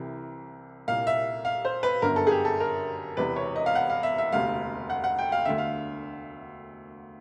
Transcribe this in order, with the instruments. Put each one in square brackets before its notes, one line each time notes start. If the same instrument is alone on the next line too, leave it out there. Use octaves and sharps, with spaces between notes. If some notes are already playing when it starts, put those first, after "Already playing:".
Already playing: [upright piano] C2 C3 E3
C2 A#2 F5
E5
F5
C5
B4
G1 F#2 D3 A#4
A4
G#4
G4
A4
A#4
E1 E2 C3 E3 B4
C#5
D#5
F5
F#5
F5
E5
E5
E1 D2 C3 F5
F#5
F#5
G5
F5
D2 D3 E5
F5